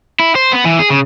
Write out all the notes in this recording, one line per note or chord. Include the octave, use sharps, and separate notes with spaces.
E4
C5
B3
E3
G#4
C#3